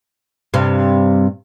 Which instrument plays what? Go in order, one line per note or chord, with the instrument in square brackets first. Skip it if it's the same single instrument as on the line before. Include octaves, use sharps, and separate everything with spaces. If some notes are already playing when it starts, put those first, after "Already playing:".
[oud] G2 C3